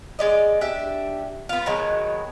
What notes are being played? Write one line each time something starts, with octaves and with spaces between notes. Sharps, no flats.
G#3 D5 D#5
D4 G4 E5
B3 F4
B2 D#3 F#3 G#3